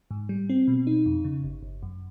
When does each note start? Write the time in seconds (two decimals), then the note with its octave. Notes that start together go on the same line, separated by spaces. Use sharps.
0.11 G#2
0.29 G3
0.49 C4
0.68 B2
0.87 D#4
1.06 F2
1.24 C#3
1.44 G1
1.63 G1
1.83 F#2